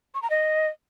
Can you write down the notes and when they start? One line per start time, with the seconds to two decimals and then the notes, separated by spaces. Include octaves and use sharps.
0.14 C#6
0.22 A#5
0.30 D#5